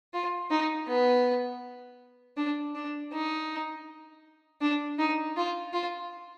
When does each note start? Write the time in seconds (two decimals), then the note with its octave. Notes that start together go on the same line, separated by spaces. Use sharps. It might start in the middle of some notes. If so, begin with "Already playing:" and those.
0.14 F4
0.50 D#4
0.88 B3
2.37 D4
2.75 D4
3.13 D#4
4.61 D4
4.98 D#4
5.36 F4
5.73 F4